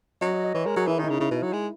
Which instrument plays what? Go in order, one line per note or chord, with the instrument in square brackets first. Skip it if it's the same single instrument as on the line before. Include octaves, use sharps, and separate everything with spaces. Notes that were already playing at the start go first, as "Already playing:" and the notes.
[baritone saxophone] F#3 [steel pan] D#5
[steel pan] D#5
D#5
[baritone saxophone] E3 [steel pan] C#5
[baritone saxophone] G#3 [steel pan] A#4
[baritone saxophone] F#3 [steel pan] G#4
[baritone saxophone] E3 [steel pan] E4
[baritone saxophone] D#3
[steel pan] D#4
[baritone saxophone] C#3
[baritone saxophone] C#3 [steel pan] E4
[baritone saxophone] B2
F#3
G#3